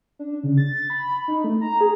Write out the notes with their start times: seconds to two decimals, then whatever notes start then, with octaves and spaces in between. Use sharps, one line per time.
0.19 D4
0.43 C#3
0.58 A6
0.90 B5
1.28 D#4
1.44 A3
1.61 A#5
1.81 G#4